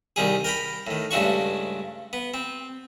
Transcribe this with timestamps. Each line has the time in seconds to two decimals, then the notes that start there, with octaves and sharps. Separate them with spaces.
0.16 C2 D#3 G3 G#4
0.44 A#4 G5 A#5 B5
0.87 A2 D#3
1.11 C#2 G2 A3 D4 F#4 C#6
2.13 B3
2.34 C4